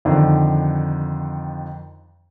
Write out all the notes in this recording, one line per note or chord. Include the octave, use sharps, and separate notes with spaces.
F2 D3 D#3